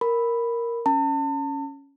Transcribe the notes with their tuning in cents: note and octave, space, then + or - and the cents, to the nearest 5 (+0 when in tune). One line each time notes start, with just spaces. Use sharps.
A#4 +0 B5 +0
C#4 +0 A5 +40